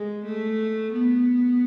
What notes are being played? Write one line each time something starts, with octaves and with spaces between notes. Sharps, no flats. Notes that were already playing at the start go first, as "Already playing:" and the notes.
Already playing: G#3
A3
B3